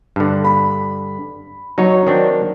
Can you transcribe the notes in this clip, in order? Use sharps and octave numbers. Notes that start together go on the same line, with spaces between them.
G2 D3
B5
F#3 D#4 C#5
D#3 C4 D4